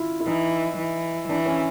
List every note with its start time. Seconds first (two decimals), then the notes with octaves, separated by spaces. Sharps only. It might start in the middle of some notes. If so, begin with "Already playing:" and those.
Already playing: E4 F4
0.20 E4
0.27 E3 D#4
0.78 E3
1.28 E3 D4
1.46 C#4